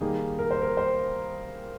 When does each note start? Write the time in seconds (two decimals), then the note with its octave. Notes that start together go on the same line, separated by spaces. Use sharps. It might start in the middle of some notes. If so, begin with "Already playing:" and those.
0.01 D#3 G3 A#3 D#4 G#4
0.39 A#4
0.51 C5
0.62 A#4
0.77 C5